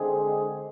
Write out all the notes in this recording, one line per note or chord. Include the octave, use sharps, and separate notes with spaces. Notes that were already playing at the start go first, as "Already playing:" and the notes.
Already playing: D3 G#3 C4 G#4